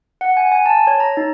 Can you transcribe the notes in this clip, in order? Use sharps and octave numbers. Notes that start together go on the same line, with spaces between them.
F#5
G#5
G#5
A5
C#5
A#5
D#4